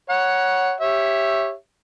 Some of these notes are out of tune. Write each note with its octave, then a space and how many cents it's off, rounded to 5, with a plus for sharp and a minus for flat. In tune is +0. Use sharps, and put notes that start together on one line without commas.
C#5 +0 F#5 +5 A#5 +45
G4 +0 C#5 -15 E5 +5